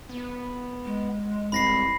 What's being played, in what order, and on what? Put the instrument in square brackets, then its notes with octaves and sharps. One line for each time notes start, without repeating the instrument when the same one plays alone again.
[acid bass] B3
[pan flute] G#3
[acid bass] E1 [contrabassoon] C2 [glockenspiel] B5 A#6 C7